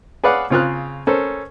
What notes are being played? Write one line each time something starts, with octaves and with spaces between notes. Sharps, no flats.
G#4 B4 C#5 D5 F5 F#5
C#3 C4 F4 G#4 F6 F#6
C#4 A4 A#4 C5